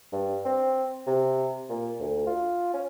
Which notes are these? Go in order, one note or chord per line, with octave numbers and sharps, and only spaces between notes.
G2
C4
C3
A#2
D2
F4
C#4